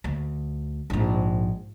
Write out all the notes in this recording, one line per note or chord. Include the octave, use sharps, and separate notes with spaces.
D2
A#1 G#2